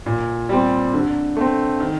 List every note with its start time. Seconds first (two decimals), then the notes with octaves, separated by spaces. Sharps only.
0.06 A#2
0.49 G3 C4
0.94 D3
1.37 A3 C4
1.80 D#3